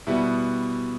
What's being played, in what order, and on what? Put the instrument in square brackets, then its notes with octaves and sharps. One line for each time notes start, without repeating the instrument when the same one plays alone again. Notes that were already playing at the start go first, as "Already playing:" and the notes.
[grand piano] B2 G3 B3 E4